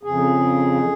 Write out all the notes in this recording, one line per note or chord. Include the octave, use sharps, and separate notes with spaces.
F2 C#3 G#4